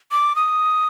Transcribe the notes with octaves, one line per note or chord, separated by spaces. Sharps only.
D6
D#6